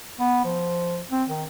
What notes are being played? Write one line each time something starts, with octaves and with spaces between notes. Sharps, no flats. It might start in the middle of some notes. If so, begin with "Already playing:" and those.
B3
F3
C4
D#3